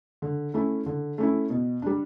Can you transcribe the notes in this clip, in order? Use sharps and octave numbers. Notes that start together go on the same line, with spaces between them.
D3
A3 C#4 E4
D3
A3 C#4 E4
B2
G3 D4